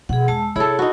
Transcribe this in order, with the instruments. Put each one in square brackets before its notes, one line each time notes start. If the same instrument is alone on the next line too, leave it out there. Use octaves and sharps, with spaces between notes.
[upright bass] B2 C4 [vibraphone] G#4 F#5
[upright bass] E2 [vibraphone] G#3 A5 E6
[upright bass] C3 [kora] E4 A4 [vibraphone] G#4 C#5
[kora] D#4 F#4 [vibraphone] B5